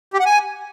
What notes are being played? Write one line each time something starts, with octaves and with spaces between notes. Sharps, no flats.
G4
F#5
G#5